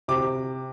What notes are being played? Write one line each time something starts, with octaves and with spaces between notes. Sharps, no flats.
C3 D6